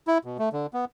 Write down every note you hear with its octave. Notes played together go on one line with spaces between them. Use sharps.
E4
B2
A3
D3
B3